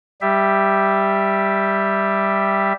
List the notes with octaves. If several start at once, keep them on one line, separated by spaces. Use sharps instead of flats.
G3 G4 E5